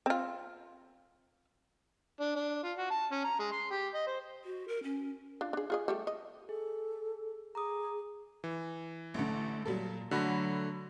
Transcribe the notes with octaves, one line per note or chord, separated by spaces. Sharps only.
C4 F4
D4
D4
F4
F#4
A5
C#4
A#5
G#3
C6
G4
D#5
C5
F#4
A#4
C#4
D4 F4
D4 G#4
F4 G#4 D#5
G3 A3 G4
D#5
G#4 A4
G#4 A#5 D6 D#6
E3
A1 D3 A3
A#2 F#3 G3 A4
D3 F#3 A3 F#4 B5 A#6